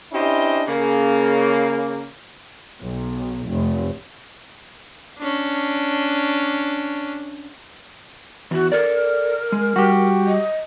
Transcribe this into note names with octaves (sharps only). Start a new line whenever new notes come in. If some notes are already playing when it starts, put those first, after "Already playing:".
C#4 D4 E4 G4 C5 D#5
C#3 A#3
B1
F1
C#4 D4
E2 F#4
A4 A#4 D5
G#3
G3 F#4 G4
D#5